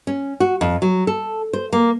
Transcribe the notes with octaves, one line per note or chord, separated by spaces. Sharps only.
C#4
F#4
F2
F#3
A4
C5
A#3